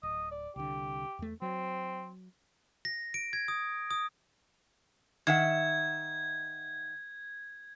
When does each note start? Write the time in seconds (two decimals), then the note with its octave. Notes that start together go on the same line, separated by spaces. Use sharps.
0.03 D1 D#5
0.31 D5
0.56 C2 D3 G4
1.19 E2 A3
1.42 F#3 C4
2.85 A#6
3.14 D7
3.33 G#6
3.48 D#6
3.91 D#6
5.27 D#3 E5 F#5 G#6